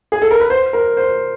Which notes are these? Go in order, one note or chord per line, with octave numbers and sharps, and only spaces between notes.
G#4
A4
A#4
B4
C5
A#4
C5